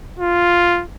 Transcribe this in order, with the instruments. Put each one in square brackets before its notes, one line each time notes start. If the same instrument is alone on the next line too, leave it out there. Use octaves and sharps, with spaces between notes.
[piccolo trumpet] F4